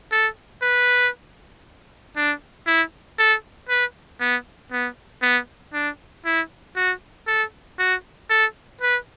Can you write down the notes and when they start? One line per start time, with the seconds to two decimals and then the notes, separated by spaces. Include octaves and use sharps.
0.12 A4
0.62 B4
2.17 D4
2.67 E4
3.19 A4
3.69 B4
4.21 B3
4.72 B3
5.22 B3
5.74 D4
6.25 E4
6.76 F#4
7.28 A4
7.79 F#4
8.30 A4
8.81 B4